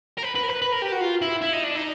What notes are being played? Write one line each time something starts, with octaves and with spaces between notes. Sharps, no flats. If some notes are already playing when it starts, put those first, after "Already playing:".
A#4
B4
B4
A#4
B4
B4
A#4
G4
F#4
F4
E4
E4
D#4
D4
D#4